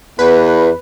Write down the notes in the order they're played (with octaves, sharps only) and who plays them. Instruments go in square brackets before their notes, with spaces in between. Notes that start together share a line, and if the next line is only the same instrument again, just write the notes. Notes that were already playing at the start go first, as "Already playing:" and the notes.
[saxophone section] E2 [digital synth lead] B4